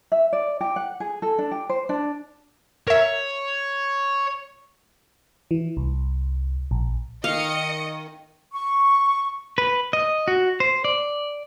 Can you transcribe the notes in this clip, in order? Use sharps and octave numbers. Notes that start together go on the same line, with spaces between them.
E5
D5
G4
F#5
G#4
A4
D4
G4
C5
D4
A#4 C#5 E5
E3
C2
A#1
D#3 D#5 F5 C#7
C#6
B4
D#5
F#4
C5
D5